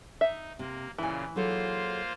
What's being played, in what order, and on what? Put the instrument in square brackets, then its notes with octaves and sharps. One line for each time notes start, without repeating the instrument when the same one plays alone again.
[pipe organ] D#4 [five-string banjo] E5
[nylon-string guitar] C3 [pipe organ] A#3
[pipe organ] A#2 C#3 [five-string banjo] E3 [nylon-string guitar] E4 G#5
[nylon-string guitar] F#3 G#4 A4 [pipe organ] A#3 F4 C5